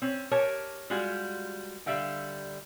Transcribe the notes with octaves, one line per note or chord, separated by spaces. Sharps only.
C4 C#4
G4 A#4 C#5 G#5 A5
G3 G#3 F4 F#4
D3 G3 E5 F5 G5